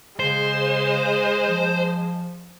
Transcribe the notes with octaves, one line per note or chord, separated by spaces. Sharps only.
C#3 G#3 C5
F3